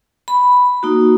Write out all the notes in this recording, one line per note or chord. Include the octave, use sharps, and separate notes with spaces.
B5
A#3 D#4 F#4